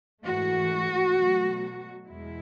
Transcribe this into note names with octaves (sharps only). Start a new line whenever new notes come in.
G#2 E3 A3 F#4
B2 F#3 A3
E2 B2 G#3 E4